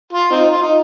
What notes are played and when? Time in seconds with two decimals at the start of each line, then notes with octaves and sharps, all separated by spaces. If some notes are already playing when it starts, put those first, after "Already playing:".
0.13 F4
0.31 C4 D#4
0.51 F4
0.63 D#4